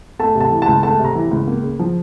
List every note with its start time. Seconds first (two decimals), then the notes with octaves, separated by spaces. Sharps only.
0.19 A3 A5
0.35 C3
0.41 A5
0.51 E3
0.62 A5
0.67 C#2
0.83 A3 A5
0.99 C3
1.05 A#5
1.15 E3
1.31 C#2
1.47 A#3
1.63 C#3
1.79 F3